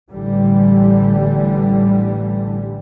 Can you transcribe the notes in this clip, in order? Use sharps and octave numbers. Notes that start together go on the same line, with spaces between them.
A1 D3 E3 G3